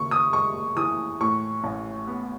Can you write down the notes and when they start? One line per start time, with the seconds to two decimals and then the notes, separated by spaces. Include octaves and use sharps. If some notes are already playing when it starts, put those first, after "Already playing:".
Already playing: D#2 C#3 C#6
0.11 D#6
0.33 G#3 C#6
0.76 E3 D#6
1.20 A2 C#6
1.64 A1
2.07 B3